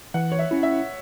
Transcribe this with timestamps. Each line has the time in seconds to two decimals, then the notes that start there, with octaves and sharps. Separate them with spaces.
0.14 E3 F#5
0.32 C#5
0.39 E5
0.51 C#4 E4
0.63 E5